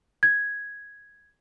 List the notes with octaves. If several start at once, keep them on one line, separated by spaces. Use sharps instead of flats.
G#6